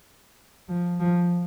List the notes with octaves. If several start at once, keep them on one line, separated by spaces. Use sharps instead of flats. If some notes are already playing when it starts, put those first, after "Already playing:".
F3
F3